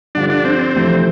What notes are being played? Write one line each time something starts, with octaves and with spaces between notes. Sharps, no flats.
G2 D3 F3 D4
D4
C4
F2 C3 E3 A3